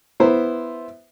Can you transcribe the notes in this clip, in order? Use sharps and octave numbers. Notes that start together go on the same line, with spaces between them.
B3 E4 C5